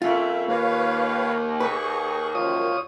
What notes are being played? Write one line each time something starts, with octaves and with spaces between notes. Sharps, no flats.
F2 C#3 A#3 F4 E5
D#2 A#3 B4 C#5 F5
G#4 B4 C#6
F#2 D#3 F3 F4 C#5 D#6